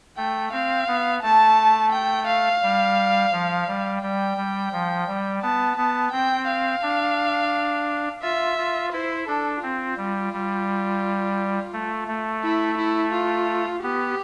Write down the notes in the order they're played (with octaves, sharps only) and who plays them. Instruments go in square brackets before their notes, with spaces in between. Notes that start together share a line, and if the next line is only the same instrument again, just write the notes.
[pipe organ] A3 [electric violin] G5
[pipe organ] C4 [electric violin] F5
[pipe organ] B3
[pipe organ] A3 [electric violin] A5
[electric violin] G5
F5
[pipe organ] G3
F3
G3
[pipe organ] G3 [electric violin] G5
[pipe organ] G3
F3
G3
[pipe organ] B3 [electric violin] A5
[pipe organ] B3 [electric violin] A5
[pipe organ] C4 [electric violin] G5
[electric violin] F5
[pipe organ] D4
[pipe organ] F4 [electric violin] E5
[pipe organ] F4
[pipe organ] E4 [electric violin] C5
[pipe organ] D4 [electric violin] A4
[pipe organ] C4 [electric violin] F4
[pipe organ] G3
G3
A3
A3
[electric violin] E4
E4
F4
[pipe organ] B3 [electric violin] G4